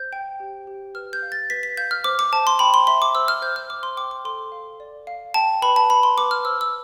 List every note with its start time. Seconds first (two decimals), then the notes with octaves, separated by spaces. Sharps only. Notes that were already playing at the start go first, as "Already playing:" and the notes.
Already playing: C5 G6
0.13 G5
0.40 G4
0.67 G4
0.94 B4 F6
1.13 G6
1.22 F5
1.32 A6
1.50 B4 B6
1.63 B6
1.77 F5 G6
1.91 F6
2.04 C5 D6
2.19 D6
2.32 C5 A5
2.47 C6
2.59 G5 B5
2.74 C6
2.87 E5 C6
3.02 D6
3.15 C5 E6
3.28 F6
3.42 C5 G6
3.56 F6
3.69 C5 D6
3.83 C6
3.97 G5 D6
4.11 D6
4.24 A4 C6
4.52 F5
4.80 D5
5.07 F5
5.34 G5 A5
5.62 B4 B5
5.76 A5
5.90 B4 B5
6.03 C6
6.18 B4 D6
6.31 F6
6.45 C5 E6
6.61 E6